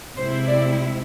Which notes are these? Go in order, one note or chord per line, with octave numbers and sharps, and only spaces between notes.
C3 G#3 C4 E4 C5
D5